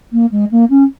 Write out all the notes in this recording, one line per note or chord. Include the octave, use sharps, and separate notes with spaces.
A#3
G#3
A#3
C#4